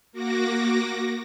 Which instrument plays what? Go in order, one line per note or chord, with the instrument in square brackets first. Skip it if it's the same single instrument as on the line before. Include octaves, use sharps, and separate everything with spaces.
[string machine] A#3 F#4 D6 A#6